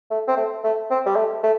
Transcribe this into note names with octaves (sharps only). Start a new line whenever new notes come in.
A3
C4
A3
A3
C4
G3
A3
A3